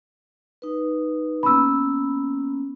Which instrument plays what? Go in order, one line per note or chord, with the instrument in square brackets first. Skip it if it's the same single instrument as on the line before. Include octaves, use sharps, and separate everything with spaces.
[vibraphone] D#4 B4
[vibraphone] A#3 B3 C#4 [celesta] B5 E6